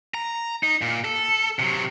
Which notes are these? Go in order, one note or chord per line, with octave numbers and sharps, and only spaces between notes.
A#5
D#4
A#2
A4
C3 F#3